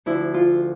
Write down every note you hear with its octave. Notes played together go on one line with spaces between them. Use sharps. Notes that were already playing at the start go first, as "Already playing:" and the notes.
D2 D3 F3 E4
F4